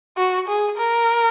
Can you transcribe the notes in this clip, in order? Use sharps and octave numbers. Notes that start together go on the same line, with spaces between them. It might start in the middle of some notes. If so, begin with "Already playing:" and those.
F#4
G#4
A#4